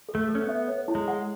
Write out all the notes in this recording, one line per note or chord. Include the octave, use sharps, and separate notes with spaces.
A4
A3
A4
C#4
B3
E5
C#5
E4
G#3
F#5